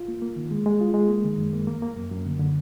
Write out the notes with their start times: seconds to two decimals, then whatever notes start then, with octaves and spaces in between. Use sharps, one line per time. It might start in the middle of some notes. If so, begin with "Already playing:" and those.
Already playing: F4
0.08 A#3
0.22 A#3
0.36 D#3
0.51 G#3
0.66 G#3
0.81 F4
0.94 G#3
1.09 A#3
1.24 D#3
1.38 F#2
1.53 A#3
1.67 A#3
1.82 A#3
1.96 F#2
2.11 F#2
2.26 D3
2.39 D3